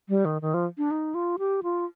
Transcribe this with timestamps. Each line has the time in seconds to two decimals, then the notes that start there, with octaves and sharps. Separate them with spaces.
0.09 G3
0.25 D#3
0.42 D#3
0.54 F3
0.78 D4
0.91 D#4
1.15 F4
1.39 G4
1.63 F4